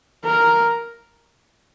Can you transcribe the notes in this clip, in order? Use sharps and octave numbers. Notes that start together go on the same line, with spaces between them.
A#4